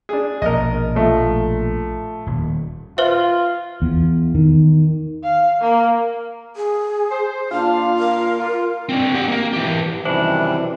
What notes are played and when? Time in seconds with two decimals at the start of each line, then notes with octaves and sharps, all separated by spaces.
0.09 D4 G#4
0.42 A#1 B2 A#4 D#5
0.95 F3 A3
2.27 D#1
2.98 F4 B4 C5 E5
3.82 E2
4.35 D#3
5.23 F5
5.61 A#3
6.56 G#4
7.10 C5
7.51 A#2 D4 F4 F5
7.98 A#4
8.40 F4
8.89 C4 D4
9.14 G4 F#5
9.28 A#3 A#4
9.53 E3 G4
10.05 F#2 C3 D#3 E3 G3 D4 C5